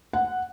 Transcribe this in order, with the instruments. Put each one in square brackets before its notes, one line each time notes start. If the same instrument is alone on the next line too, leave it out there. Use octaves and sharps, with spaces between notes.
[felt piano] F#5